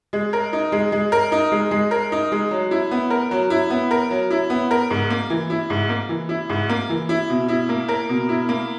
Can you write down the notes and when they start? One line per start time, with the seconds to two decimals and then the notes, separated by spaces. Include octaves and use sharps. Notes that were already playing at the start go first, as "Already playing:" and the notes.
0.13 G#3
0.33 A#4
0.53 D#4
0.72 G#3
0.92 G#3
1.12 A#4
1.32 D#4
1.52 G#3
1.71 G#3
1.91 A#4
2.12 D#4
2.32 G#3
2.51 F#3
2.71 E4
2.91 B3
3.10 A#4
3.31 F#3
3.50 E4
3.70 B3
3.91 A#4
4.11 F#3
4.30 E4
4.50 B3
4.71 A#4
4.90 G#2
5.10 A#3
5.30 E3
5.50 E4
5.70 G#2
5.89 A#3
6.09 E3
6.29 E4
6.49 G#2
6.69 A#3
6.89 E3
7.09 E4
7.30 B2
7.48 E4
7.69 A#3
7.88 A#4
8.09 B2
8.29 E4
8.49 A#3